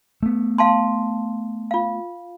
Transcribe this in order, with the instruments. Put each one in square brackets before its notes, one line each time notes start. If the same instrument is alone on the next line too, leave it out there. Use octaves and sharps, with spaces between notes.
[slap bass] A3 B3
[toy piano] F5 A5 C6
F4 F5